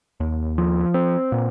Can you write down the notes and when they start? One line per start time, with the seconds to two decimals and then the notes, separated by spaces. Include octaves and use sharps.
0.20 D#2
0.58 F3
0.94 C4
1.32 A#2